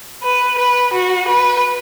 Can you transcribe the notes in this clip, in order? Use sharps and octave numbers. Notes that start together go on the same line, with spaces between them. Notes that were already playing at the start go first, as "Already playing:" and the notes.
B4
B4
F#4
B4